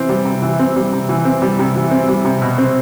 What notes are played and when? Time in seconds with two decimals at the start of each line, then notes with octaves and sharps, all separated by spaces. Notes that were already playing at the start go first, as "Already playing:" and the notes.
Already playing: E3 C4
0.09 G3
0.25 C3
0.42 E3
0.59 C4
0.76 G3
0.93 C3
1.09 E3
1.25 C4
1.42 G3
1.59 C3
1.76 E3
1.91 C4
2.08 G3
2.25 C3
2.41 B2
2.58 C4